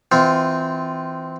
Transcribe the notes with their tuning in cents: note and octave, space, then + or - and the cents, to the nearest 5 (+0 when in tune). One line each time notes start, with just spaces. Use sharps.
E3 -20 C4 -15 F4 +0